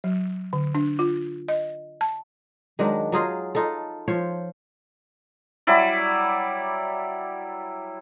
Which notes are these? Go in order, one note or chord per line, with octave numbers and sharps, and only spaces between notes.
F#3
D3
D4
F4
D#5
A5
D#3 F#3 G#3 D4
F#3 D#4 F4 G#4
D#4 F4 A4
F3 F4 C5 C#5
F#3 G3 E4 D5